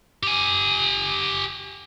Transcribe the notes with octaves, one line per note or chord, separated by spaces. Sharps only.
G4 G#5